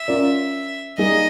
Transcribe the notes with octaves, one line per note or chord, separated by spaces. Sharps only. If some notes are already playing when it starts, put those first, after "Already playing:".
Already playing: E5
C#4 F4 A#4 D5
G3 A#3 D#4 G#4 D#5